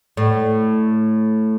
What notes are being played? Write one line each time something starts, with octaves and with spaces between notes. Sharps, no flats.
A2